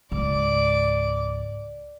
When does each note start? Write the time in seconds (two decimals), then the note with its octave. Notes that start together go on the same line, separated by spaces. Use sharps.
0.11 C#2 G#2 D5 D6